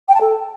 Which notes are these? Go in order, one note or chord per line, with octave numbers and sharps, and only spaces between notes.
G5
A5
A4